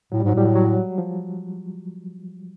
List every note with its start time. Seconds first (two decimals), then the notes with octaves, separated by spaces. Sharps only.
0.12 A2 F#3
0.20 G3
0.24 G#2 F#3
0.35 A2 G3
0.45 F#3
0.56 F#3
0.98 F3